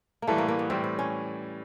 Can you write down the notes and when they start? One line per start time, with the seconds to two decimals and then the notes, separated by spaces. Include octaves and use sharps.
0.22 A#3
0.27 A2 E3 G3 A3
0.38 A#3
0.48 A#3
0.59 B3
0.70 A2 E3 G3 C4
0.84 C4
0.99 C#4